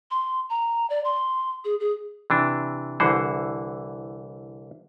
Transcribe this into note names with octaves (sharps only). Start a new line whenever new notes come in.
C6
A#5
D5
C6
G#4
G#4
C3 E3 D4
C2 D3 E3 C5 F#5